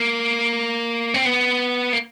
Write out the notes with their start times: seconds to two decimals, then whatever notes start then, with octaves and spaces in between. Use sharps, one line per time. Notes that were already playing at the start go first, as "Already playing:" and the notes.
Already playing: A#3
1.14 C4
1.25 B3
1.93 A#3